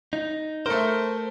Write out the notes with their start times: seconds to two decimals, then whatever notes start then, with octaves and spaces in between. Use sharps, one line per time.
0.13 D#4
0.66 A3 A#4 C5